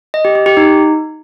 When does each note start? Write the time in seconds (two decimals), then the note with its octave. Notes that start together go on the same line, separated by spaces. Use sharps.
0.14 D#5
0.25 G4
0.35 G4
0.46 G4
0.57 D#4